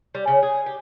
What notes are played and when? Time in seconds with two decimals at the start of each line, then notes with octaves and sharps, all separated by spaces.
0.15 G3
0.28 C#3
0.43 G#4
0.66 G4